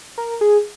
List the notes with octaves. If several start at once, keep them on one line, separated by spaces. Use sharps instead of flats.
A#4
G#4